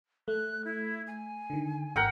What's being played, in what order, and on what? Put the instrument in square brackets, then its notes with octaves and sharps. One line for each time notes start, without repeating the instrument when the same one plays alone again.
[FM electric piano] A3 [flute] F#6
[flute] E4
G#5
[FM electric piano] D3 D#3
[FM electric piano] G#1 [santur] A#4 F#5 G5